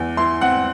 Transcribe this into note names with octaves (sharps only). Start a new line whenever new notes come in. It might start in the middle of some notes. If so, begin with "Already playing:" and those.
Already playing: E2
E4 C6
C4 F#5